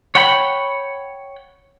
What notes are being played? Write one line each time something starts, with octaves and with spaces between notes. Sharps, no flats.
C#5 F#5 G5 B5